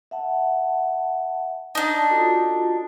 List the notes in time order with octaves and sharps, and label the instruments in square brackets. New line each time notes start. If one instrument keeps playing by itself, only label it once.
[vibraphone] E5 F#5 A5
[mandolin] D4 D#4 [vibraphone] A5
[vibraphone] F4 F#4 A4